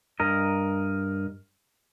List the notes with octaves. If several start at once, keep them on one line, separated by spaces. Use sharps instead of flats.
G2 A#4 D#5